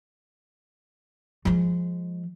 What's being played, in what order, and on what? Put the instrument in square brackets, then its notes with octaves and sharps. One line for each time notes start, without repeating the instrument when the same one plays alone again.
[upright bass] F3 G#3